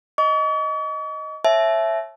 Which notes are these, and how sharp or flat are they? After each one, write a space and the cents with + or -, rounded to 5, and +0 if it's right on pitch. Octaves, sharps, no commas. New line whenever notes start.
D#5 +5 C#6 +45
C#5 -30 E5 +5 A5 -35